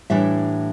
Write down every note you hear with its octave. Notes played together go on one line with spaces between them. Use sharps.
A2 E3 G3 D4 E5